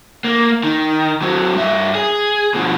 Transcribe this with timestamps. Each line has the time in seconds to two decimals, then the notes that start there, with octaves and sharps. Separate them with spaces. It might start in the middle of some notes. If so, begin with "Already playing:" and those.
0.24 A#3
0.64 D#3
1.22 F#3 C4
1.55 G2 E5
1.95 G#4
2.54 B2 F3